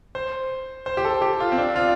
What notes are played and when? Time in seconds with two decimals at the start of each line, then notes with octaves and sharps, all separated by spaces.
0.15 C5
0.86 C5
0.97 G4
1.05 A4
1.22 G4
1.40 F4
1.52 C4
1.58 D4
1.76 F4